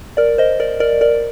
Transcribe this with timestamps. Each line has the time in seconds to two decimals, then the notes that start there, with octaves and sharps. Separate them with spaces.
0.17 A#4 D5
0.38 C5 D#5
0.60 A#4 D5
0.80 A#4 D5
1.01 A#4 D5